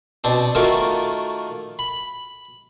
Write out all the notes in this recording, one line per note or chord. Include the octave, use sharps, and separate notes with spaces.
B2 C4 D4
D#3 A3 A#3 F4 F#4 A#4
B5